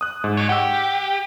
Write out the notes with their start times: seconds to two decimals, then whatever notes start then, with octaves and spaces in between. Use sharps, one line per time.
0.01 D#6 F#6
0.24 G#2
0.37 F#4 C#5
0.49 G4 F#5 E6